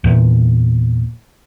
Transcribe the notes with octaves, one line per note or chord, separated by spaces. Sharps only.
E2 A#2